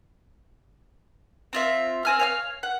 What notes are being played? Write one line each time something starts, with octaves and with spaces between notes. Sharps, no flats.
C4 F4 E5
C4 G#5 F6
C#5 F5 F6
F#5